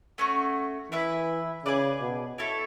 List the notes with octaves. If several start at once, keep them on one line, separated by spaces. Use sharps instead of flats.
A3 C#4 F#4
E3 E4 B4 E5
C#3 G#4 B4 D5
B2
E4 A4 C#5 E5